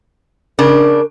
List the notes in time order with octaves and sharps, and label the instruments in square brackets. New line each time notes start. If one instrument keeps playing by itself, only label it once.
[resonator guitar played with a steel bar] C#3 D4 [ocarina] A#4